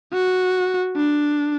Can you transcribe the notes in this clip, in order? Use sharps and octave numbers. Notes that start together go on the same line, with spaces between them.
F#4
D4